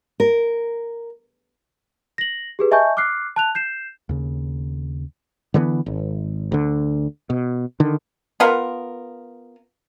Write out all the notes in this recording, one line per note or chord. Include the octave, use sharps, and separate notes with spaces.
A#4
A#6 F#7
G4 G#4 B4
D#5 E5 G#5 A5 C#6 G6
D6 F6 F#6 C7
A5 F#6 F7
G6 C7 E7
D#2 C#3
D3 E3 G3 B3
G#1
D2 D3
B2
D3 D#3
B3 F4 A#4